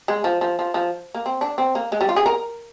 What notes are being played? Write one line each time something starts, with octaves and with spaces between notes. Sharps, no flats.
G#3
F3
F3
F3
F3
A#3
C4
D4
C4
A#3
G#3
G3
F4
G#4
A#4